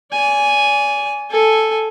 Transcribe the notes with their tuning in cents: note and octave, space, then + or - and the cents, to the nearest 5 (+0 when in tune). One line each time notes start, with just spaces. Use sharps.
D5 -35 G#5 +0
A4 +0 G#5 +0